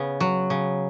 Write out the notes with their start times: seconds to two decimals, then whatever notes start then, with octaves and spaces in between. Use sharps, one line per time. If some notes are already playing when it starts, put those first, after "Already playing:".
Already playing: C#3 B3
0.20 F#3
0.50 C#3